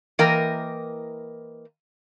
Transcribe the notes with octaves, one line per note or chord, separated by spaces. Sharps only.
E3 A#3 A#4 D#5 G5